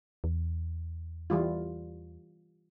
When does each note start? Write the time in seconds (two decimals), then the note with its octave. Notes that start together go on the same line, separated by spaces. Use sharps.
0.24 E2
1.30 E3 G3 F4